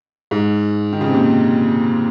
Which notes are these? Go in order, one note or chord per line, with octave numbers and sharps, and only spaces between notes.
G#2
D#3
C#3
C3
A#2